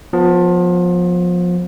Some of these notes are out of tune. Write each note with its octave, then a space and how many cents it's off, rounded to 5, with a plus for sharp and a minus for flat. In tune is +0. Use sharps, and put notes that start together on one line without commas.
F3 +25 B3 +0